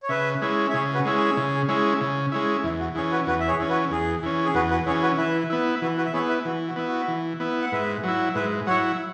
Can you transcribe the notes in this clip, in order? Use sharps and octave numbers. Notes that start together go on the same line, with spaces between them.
C#5
C#3 B4 E5
G#3 C#4 E4
E5
C#3 G#4 C#5
F#4 B4
G#3 C#4 E4
G#4
C#3
G#3 C#4 E4
C#3
G#3 C#4 E4
E2 E4
F#4
E3 C#4 G#4
F#4 B4
E2 F#4 B4
E5
G#4 C#5
E3 C#4
F#4 B4
E2 G#4
E3 C#4
G#4
E2 F#4 B4
F#4 B4
E3 C#4 G#4 C#5
F#4 B4
E3 B4 E5
B3 E4
E3 F#4 B4
F#4 B4
E5
B3 E4 G#4 C#5
B4 E5
E3 F#4
F#4
B3 E4
F#4
E3
B3 E4
F#5
G#2 B4 E5
F#3 E4
G#2 B4 E5
F#3 E4 C#5 F#5